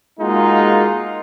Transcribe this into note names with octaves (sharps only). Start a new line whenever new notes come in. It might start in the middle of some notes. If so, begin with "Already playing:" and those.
G#3 A#3 D#4 F4 F#4